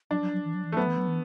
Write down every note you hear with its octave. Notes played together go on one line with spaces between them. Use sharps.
F#3 D4
F#3
F#3
E3
F#3
E3
A3
F#3 B3
E3
F#3
E3